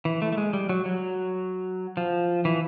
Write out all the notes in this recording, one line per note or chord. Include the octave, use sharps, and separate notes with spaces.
E3
A3
A3
G#3
G3
F#3
F#3
F3
E3